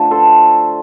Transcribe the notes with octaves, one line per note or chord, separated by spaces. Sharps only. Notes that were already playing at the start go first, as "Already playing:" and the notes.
Already playing: D3 F3 A3
A4 C5